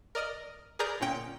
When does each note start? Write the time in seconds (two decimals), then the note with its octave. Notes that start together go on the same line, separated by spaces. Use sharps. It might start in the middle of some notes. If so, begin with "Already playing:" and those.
0.15 A#4 D5 D#5 F6
0.79 G#4 A#4 B4 D5 A#5 G6
1.00 G1 A#2 C#4 G5